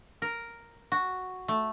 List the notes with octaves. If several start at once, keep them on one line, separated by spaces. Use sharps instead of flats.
A#4
F#4
A3